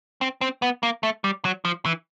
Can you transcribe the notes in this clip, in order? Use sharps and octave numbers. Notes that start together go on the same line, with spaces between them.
C4
C4
B3
A#3
A3
G3
F#3
F3
E3